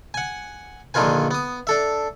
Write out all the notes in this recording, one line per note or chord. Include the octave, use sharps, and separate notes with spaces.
F#5 G#5
A#1 D3 D#3 F4 B4 G#5
B3 D#6
D4 A4 E5